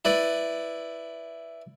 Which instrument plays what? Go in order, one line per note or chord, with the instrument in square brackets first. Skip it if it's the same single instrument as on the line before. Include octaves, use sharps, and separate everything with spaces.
[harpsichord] E4 B4 D5